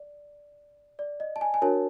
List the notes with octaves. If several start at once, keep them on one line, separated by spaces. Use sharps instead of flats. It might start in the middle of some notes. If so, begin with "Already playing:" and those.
Already playing: D5
D5
D#5
A5
G#5
G#5
D4 F#4 A#4 C#5 A5